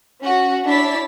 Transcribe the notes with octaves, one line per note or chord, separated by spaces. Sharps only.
C#4 F#4
D4 E4 C#5 A6 B6